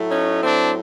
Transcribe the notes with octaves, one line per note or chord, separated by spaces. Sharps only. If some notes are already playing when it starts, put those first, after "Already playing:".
Already playing: A2 F#3 A3
C#4 D#4
C4 D4